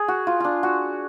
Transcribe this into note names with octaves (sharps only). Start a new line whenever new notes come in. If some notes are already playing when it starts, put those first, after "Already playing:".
Already playing: G#4
F#4
F4
D4 F4
F#4